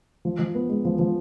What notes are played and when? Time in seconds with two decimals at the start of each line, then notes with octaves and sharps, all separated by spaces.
0.25 F3
0.39 F3
0.55 B3
0.69 G#3
0.85 F3
0.99 F3